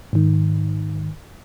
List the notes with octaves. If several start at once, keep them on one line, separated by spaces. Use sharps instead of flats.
G#2 D#3